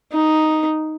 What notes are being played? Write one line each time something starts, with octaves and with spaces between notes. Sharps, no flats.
D#4